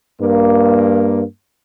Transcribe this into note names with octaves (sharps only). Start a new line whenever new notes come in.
G2 A#3